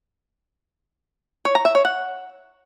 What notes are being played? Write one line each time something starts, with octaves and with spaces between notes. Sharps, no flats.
C#5
A#5
E5
C#5
F#5